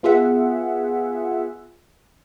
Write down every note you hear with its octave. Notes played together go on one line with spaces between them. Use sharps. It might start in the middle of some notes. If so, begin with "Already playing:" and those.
B3 F4 G#4 E5 F#5